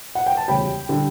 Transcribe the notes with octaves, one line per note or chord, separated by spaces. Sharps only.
F#5
G5
A5
E1 D2 C#3 G3 G5 B5
D3 G3